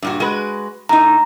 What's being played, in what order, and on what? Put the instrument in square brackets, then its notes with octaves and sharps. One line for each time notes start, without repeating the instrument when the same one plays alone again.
[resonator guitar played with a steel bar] G2 A#2 F#4
G#3 F#4 B4
[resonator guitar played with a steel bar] A2 D#4 [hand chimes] A#5